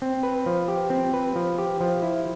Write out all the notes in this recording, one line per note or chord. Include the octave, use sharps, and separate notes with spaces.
C4
B4
F3
G4
C4
B4
F3
G4
F3
E4